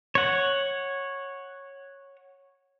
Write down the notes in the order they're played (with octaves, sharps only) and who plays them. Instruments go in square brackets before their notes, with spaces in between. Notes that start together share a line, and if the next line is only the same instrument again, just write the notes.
[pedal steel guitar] C#5 F#5